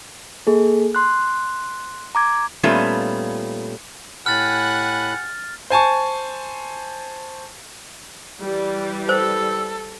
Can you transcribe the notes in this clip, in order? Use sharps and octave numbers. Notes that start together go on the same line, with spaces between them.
A#3 G#4 A4
C6 F#6
A#5 D6 G#6
A#2 G3 A3 B3 C#4 F4
A2 G4 F#5 G#5 B5 F6 F#6 A6
C5 G#5 A5 C#6
E3 G3
A4 C5 E6